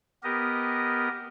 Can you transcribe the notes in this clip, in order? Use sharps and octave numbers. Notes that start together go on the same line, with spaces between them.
B3 G4 A#4 D#5